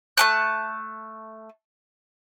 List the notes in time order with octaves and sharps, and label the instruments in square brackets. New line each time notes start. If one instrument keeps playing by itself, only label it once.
[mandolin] A3 A5 F#6